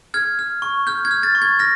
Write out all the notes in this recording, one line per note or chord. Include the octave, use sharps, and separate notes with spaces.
F6 G#6
F6
C#6
F6 G6
G#6
F6
A6
C#6
G#6
F6 A#6